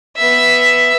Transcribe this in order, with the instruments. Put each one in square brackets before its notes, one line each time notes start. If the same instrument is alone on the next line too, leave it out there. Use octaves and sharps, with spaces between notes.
[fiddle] B3 E5